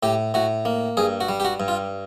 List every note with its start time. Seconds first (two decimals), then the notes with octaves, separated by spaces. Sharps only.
0.03 A2 G4
0.34 A2 F#4
0.65 A#3
0.97 G2 G#4
1.21 F#4
1.29 G3
1.40 G4
1.45 F#4
1.60 G2
1.68 F4